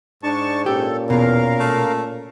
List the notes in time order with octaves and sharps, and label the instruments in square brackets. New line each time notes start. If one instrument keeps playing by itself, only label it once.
[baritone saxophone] G#2 [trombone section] D4 [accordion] A5 C#6
[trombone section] A#2 C#4 [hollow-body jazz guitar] G4 [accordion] A4
[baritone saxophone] E2 [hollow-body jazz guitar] B2 [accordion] A#4 F5
[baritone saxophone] A3